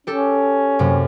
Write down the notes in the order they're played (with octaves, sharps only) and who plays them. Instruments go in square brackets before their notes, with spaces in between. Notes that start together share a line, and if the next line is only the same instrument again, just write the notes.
[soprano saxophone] C#4 [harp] G4 A4
[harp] F#2 C3 A#3